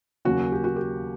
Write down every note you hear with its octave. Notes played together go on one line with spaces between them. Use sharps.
D#2 C#3 F#3 A#3 C#4 F#4
G4
F#4
G4